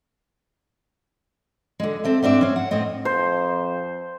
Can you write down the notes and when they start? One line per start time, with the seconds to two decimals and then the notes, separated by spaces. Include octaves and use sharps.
1.80 D3 G#3
2.04 C4 A4 E5
2.23 G#2 C4 D4 E5
2.41 C4 C#4
2.56 F#5
2.71 A2 C4 D#5
3.05 F2 C5